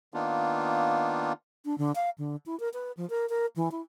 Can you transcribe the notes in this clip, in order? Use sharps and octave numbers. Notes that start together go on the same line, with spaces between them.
D#3 A#3 B3 D4 D#4 F4
D4
D3
F5
D3
E4
A#4
B4
F3
A#4
A#4
E3
E4